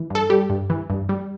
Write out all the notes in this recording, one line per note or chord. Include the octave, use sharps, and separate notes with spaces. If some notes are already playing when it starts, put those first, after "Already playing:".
Already playing: E3
G2 A4
G3 G4
G2
E3
G2
G3